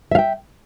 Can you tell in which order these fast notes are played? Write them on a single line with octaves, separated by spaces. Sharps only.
E5 F5 G5